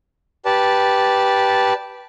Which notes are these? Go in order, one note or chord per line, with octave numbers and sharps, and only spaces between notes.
G4 B4 D5 A5